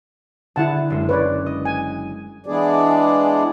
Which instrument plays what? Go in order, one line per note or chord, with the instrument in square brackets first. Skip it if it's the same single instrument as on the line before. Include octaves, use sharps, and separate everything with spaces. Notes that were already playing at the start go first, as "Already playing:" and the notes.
[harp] D3 G#4 [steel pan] E4 F#5 A5
[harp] F#1 G#3
[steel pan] B4 C#5 D5
[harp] D#5
[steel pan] G#5
[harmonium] E3 G#3 B3 D4 G#4 D5